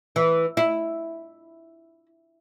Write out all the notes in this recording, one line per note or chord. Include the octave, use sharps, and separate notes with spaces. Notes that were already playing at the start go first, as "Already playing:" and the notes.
E3
E4